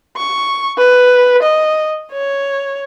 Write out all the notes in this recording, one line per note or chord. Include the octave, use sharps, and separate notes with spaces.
C#6
B4
D#5
C#5